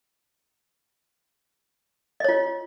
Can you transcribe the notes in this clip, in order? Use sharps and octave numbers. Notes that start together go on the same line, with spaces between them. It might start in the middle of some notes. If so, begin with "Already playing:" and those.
F4 C#5 D#5